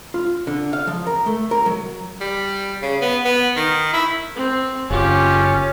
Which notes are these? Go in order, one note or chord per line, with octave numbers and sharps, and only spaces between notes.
F4
D3
F5
F3
A#4
A3
A#4
F#3
G3
C#3
B3
B3
D#3
E4
C4
F#1 C#4 F4 G4